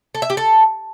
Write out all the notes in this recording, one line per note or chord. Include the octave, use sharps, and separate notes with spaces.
A4
E5
G4
A4